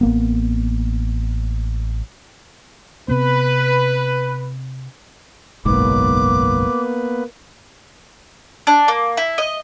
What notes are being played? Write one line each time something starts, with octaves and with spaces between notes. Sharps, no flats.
A1 A#3 B3
C3 B3 C4 B4
F#1 B1 G#2 A#3 B3 B4 D6
D4
A#3
E4
D#5